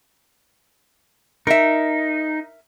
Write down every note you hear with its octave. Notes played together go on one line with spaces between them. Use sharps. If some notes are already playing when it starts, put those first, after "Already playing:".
D#4 A#4 E5